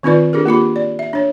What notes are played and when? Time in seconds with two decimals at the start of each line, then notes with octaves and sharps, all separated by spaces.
0.03 D#3 C4 D#4 F4 B4 D5
0.33 D4 G4 G#4 A#4
0.46 A#3 F4 G4 B5
0.76 D5
0.99 E5
1.13 D4 C#5